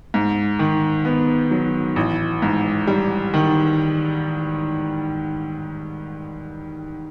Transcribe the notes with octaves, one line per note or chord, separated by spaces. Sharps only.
G#2
D#3
B3
F#3
A1
G#2
G3
D#3